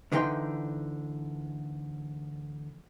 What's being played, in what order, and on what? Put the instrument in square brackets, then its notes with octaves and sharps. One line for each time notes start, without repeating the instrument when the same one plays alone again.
[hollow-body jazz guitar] D2 D3 E3 D#4 G5 C6